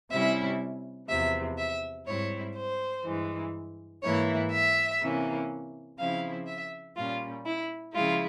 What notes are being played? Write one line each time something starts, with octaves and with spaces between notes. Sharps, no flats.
C3 G3 C#4 E4 E5
E2 C3 F3 E5
E5
G#2 G3 C4 E4 C#5
C5
G2 E3 G#3
G#2 E3 A#3 E4 C#5
E5
C3 E3 A#3 C#4
C#3 F3 C4 E4 F5
E5
A#2 G3 C#4 F4
E4
C#3 F3 G#3 E4 F4